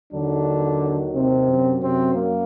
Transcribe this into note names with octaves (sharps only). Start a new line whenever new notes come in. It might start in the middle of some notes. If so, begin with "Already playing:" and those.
D#2 D3 D#3 F#3 D4
C3 C4
F#2 F#3
C3 C4
A#3